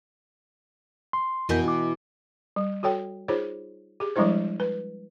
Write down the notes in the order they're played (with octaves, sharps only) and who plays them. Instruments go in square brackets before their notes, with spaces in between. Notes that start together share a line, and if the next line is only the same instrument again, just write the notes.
[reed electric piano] C6
[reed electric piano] F2 A#4 G6 [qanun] B2 E3 D#5
[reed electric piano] E4 D6
[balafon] G3
F#4 A4 C#5 G5
D#4 F4 G#4 C5 C#5
G4 G#4
F3 G3 G#3 D4 E4 C5
B4